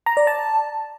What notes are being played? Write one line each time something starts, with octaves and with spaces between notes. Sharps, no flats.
A#5
D5
A5